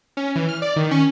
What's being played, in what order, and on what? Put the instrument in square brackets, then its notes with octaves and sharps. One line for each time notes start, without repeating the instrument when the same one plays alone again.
[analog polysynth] C#4
E3
F6
D5
D#3
C#4